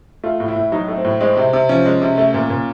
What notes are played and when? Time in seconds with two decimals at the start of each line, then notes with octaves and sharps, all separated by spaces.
0.24 A3 F4
0.40 A2
0.48 E4
0.56 A2
0.72 F#3 D#4
0.88 A3
0.96 C4
1.05 A2
1.20 G#3 C4
1.37 C3
1.53 C3
1.69 F3 C#4
1.86 G#3
2.02 C3
2.18 A3
2.34 A#2
2.50 A#2